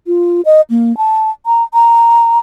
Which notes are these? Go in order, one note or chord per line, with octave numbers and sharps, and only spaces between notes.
F4
D#5
A#3
A5
A#5
A#5